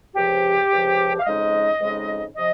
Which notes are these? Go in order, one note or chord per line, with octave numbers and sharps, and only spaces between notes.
C#2 C3 F3 G4
C#2 C3 F3
F5
F2 C#3 G#3 D#4 D#5
F2 C#3 G#3 D#4
C3 F3 D#5